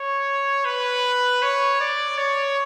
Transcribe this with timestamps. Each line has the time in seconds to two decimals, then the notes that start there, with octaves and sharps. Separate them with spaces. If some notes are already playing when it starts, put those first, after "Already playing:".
Already playing: C#5
0.65 B4
1.42 C#5
1.81 D5
2.18 C#5